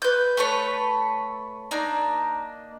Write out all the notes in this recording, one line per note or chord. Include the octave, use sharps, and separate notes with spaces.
B4 G6
A3 A4 B4 C#5
A#3 D4 D#4